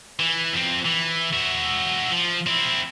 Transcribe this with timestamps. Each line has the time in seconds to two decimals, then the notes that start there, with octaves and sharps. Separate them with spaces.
0.20 E3
0.54 F2 C4
0.86 E3
1.33 F#4 E5
2.12 F3
2.46 C4 E4